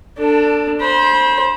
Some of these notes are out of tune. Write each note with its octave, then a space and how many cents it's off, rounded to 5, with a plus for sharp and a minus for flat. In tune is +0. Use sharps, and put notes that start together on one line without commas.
D4 +0 A4 +25
C5 +10 B5 -35